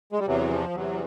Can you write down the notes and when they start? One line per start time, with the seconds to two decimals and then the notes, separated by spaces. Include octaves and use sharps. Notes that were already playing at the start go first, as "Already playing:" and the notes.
0.12 G#3
0.19 G3
0.27 E2 C3 E3 F#3
0.51 F3
0.74 E2 C3 E3 F#3